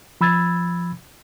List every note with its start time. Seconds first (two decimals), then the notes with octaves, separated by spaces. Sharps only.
0.21 F3 B5 E6 G#6 A6